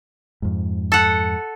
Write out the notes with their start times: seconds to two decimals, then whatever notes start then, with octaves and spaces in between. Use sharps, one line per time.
0.42 F2 G#2
0.92 A4 F#5